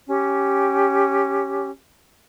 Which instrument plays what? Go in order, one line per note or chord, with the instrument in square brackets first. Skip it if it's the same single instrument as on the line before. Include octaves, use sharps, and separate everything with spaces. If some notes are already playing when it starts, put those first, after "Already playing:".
[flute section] C#4 G4